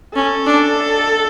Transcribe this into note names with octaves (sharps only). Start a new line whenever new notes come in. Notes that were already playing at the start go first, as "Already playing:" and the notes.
C#4 A4
D4